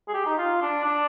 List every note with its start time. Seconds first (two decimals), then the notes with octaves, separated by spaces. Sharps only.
0.08 G#4
0.14 G4
0.26 D#4
0.38 F4
0.62 D4
0.85 D4